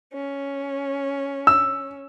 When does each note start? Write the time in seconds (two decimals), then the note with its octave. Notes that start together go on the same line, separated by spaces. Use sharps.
0.13 C#4
1.47 E6